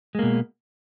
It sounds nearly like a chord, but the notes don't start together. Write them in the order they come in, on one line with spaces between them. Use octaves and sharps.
G#3 A#3 B2